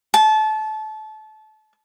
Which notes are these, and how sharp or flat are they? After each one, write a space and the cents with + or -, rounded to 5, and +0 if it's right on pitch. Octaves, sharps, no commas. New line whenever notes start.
A5 -25